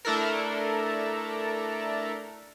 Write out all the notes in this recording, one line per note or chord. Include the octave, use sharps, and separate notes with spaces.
A3 D4 E4 A4 A#4